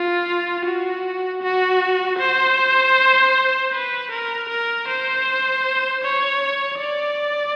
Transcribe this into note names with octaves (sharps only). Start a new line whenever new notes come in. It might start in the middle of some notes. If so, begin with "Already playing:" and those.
Already playing: F4
F#4
F#4
C5
B4
A#4
A#4
C5
C#5
D5